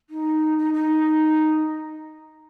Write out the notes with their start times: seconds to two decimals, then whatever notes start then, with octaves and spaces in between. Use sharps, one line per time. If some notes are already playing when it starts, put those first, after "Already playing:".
0.10 D#4
0.58 D#4
0.73 D#4